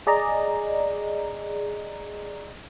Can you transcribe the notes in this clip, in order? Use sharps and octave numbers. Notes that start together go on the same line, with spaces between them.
G#4 D5 D#5 A#5